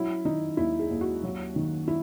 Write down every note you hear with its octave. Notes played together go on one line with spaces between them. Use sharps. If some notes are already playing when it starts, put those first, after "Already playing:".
Already playing: F#3 E4
D#3 D#4
D#2 E4
G#4
D#2
F#4
F#3
D#3
E4